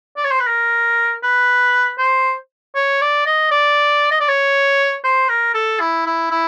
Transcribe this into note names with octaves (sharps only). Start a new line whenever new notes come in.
D5
C#5
C5
B4
A#4
B4
C5
C#5
D5
D#5
D5
D#5
D5
C#5
C5
A#4
A4
E4
E4
E4